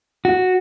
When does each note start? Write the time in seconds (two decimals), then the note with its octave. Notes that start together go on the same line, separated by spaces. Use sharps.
0.25 F#4